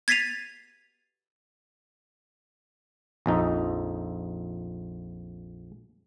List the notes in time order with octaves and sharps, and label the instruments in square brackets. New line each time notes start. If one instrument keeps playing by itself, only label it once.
[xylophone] G#6 A6 B6 C7 D#7 F7
[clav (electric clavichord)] A#1 F2 D#4